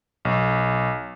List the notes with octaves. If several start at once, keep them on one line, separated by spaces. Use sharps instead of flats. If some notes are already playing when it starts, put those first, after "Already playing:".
B1